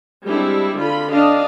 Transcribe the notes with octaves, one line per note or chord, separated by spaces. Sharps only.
G3 G#3 C4 D4 E4
D3 F4 B5
D4 D#5 F5